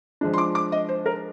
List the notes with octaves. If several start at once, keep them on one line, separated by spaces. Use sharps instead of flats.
F3 G#3 D4
C6
D6
D6
D#5
C5
A#4